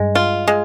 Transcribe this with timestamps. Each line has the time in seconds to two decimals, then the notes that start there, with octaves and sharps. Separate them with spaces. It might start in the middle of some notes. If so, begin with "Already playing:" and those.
Already playing: G2 G#3
0.15 F4
0.47 G#3